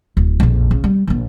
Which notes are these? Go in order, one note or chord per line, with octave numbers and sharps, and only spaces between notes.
D1
A#1 F2
C#3
G3
A#1 D3